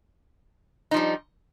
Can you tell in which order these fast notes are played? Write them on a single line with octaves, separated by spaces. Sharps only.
D#4 F3 G3